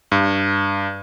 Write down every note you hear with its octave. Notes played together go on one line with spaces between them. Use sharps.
G2